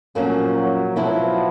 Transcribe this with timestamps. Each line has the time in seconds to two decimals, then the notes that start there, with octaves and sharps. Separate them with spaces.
0.15 A#2 F3 F#3 A#3 C#4
0.55 F#3
0.96 B2 F3 F#3 B3 E4